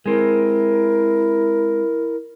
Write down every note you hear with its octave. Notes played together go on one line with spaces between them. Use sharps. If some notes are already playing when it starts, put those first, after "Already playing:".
G#3 C4 E4 A#4